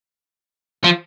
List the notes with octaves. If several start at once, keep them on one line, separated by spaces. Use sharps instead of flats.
F3